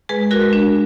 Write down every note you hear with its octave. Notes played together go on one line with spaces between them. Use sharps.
G#3 G#4 B4
F#4 A#4
G#3
D4